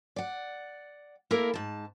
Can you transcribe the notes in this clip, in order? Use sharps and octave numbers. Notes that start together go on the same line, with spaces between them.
D5 F#5
A#3 E4 A4 A#4
G#2 A5